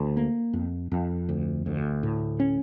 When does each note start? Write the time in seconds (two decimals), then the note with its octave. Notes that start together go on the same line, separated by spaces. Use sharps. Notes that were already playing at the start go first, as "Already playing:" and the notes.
Already playing: D2
0.17 A#3
0.53 F2
0.92 F2
1.29 D2
1.66 D2
2.03 A2
2.40 C#4